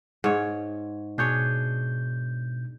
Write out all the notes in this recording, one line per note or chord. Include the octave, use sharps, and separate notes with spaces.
G#2 C#5
B2 D4 G#4 C#5 G6